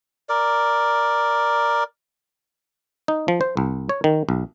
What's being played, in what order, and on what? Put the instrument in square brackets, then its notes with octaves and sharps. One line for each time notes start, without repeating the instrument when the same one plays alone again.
[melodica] A#4 D5
[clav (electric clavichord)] D#4
F3
C5
C2
C#5
D#3
B1